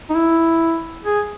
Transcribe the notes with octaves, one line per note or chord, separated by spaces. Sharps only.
D#4
E4
G#4